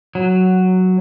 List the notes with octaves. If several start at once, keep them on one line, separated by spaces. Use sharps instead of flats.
F#3